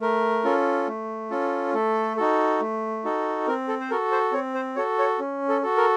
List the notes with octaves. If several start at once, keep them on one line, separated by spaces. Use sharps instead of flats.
A3 A#4
C#4 F4 A4
A3
C#4 F4 A4
A3 A4
D#4 F#4 A4
A3
D#4 F#4 A4
C4 A#4
A4
C5
F#4 A4 A#4
C5
C4 C#5
C5
F#4 A4 C#5
C#5
C#4
A4
F#4 A4
A#4